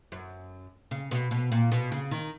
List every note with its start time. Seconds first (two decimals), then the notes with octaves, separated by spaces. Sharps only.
0.12 F#2
0.91 C#3
1.11 B2
1.31 B2
1.52 A#2
1.72 B2
1.92 C#3
2.11 D#3